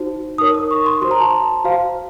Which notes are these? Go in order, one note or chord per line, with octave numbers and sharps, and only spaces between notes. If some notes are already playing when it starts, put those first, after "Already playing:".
Already playing: D#4 F#4 C5
D#4 A#4 C#5 D#6
D#6
C#6
C6
F#4 C5 C6
A#5
A5
A#5
F#4 C5 F5